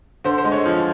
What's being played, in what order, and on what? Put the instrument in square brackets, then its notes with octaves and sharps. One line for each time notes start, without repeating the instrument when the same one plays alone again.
[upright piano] D3 C5
C5
G#3
C#5
F3